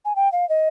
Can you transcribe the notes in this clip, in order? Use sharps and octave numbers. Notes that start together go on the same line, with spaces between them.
G#5
G5
F5
D#5